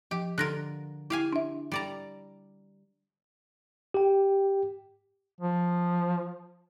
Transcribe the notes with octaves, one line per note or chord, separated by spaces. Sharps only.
F3 G4
D3 F4 A#4 F#6 A#6
E4 G4 F5 G#5
D4 E5
G3 D5 A#5
G4 G5
F3